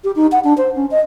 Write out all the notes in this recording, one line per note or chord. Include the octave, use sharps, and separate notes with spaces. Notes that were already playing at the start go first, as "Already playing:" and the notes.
G4
D#4
F#5
D4
C5
C#4
D#5